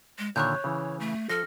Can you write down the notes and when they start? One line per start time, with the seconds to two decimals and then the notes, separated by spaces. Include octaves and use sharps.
0.19 G#3
0.36 A#2 D3 D#3 C#5 C#6 F#6 G6
0.64 C#3 E3
1.00 A3
1.30 F3 A4 F6 A#6